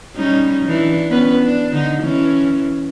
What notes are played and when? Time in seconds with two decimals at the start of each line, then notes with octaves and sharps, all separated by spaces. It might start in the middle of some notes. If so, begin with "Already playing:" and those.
0.16 G3 C#4 D#4
0.65 E3 D4
1.11 B3 C#4 B4
1.42 D4
1.73 D3 D#4
2.03 E3 C#4